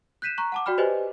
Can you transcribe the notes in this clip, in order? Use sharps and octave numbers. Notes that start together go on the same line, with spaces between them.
F#6 G6 B6 D#7 E7
A#5 C#6 F#6
F#5 A5 D6
F#4 D5 G5 B5 F6
G4 B4 C5 D5 D#5 G#5